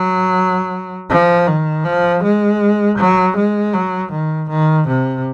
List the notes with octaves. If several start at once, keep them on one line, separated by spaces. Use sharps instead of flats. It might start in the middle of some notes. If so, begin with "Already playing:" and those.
Already playing: F#3
F3
D#3
F3
G#3
F#3
G#3
F#3
D#3
D#3
C3